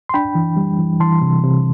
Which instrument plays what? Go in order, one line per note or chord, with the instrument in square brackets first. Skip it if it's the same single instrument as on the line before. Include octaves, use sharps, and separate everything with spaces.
[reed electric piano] C6
D4 G5 B5
E3
G3
E3
E3 A5 C6
C3
C3